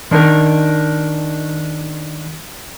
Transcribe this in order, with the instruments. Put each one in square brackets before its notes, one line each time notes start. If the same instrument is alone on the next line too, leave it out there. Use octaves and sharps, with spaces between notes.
[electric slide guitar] D#3 D4 D#4 A#4